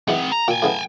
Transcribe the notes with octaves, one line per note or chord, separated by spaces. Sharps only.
E3 G#3 C4 F#5
A#5
A#2 G5 G#5
A2 C#3 B3